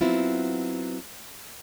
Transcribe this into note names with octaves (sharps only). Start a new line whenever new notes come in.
F#3 B3 C4 E4 F4